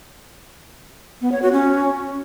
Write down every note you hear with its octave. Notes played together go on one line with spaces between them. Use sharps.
B3
C#5
F#4
C#4